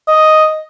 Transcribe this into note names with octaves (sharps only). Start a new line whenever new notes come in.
D#5